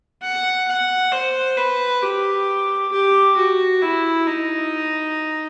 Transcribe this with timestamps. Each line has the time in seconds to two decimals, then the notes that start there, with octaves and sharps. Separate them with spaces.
0.22 F#5
0.68 F#5
1.12 C5
1.57 B4
2.02 G4
2.92 G4
3.37 F#4
3.82 E4
4.27 D#4